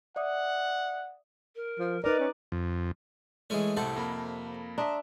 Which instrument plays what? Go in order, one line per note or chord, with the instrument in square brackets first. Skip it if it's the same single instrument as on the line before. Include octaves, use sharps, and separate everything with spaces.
[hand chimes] D5 E5 D#6 [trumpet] F#5
[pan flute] A#4
[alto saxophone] F3
[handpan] D#4 D5 [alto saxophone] A#4 [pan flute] B4
[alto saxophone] C#4
[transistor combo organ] F2
[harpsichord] E3 G#3 C#4 [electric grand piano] A3 G#4
[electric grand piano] C2 A2 [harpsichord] C3 C5 F#5 [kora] A4
[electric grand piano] F2 A#3 B5
[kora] D4 E5 [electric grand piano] A#5 C6 D#6